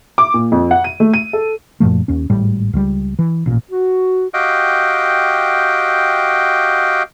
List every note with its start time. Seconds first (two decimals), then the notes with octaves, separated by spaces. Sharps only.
0.18 D6
0.34 A#2
0.52 F2
0.71 F#5
0.84 D#7
1.00 A3
1.14 D#7
1.33 A4
1.80 F#2 A#2 F3 A3
2.08 D#2 C#4
2.30 G#1 A2 G3
2.73 C#2 G3
3.19 E3
3.46 A1 A#2
3.70 F#4
4.34 F#4 G4 D#5 F5 G5